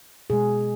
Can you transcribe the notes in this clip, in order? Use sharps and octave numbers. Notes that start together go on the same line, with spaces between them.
B2 G#3 G#4